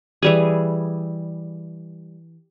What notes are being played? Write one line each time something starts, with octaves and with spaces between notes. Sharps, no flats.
E3 G3 G#4